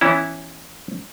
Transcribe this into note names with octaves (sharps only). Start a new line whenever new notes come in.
E3 B3 C#4 E4